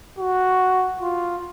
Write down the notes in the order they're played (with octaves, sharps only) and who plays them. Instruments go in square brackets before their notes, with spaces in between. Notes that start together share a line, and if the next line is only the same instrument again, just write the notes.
[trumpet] F#4
F4